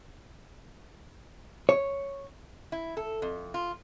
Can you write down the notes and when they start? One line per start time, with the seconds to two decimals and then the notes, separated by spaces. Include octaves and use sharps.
1.69 C#5
2.72 E4
2.97 A4
3.22 F2
3.54 F4